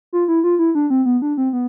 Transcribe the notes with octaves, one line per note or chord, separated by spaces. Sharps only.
F4
E4
F4
E4
D4
C4
B3
D4
C4
B3